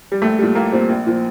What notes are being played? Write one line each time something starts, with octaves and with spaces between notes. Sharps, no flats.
G3
A#1 A3
A#2 G3
A#1 A#3
A#2 G3 C4
A#1
A#2 F3